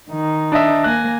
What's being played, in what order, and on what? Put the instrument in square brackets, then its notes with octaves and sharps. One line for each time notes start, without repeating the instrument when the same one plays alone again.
[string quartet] D#3 D#4
[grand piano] D4 D#5 E5
[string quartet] A#3 G#5 A#6 [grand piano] F#6